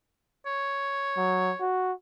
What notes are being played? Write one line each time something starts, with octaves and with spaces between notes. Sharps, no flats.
C#5
F#3
F#4